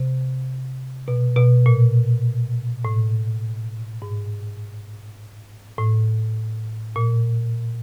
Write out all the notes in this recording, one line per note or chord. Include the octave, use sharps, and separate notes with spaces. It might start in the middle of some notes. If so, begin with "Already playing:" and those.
Already playing: C3
B2
B2
A#2
A2
G#2
A2
A#2